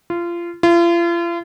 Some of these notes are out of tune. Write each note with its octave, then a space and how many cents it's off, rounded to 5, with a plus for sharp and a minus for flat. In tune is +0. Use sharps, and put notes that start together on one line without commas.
F4 -25
F4 -40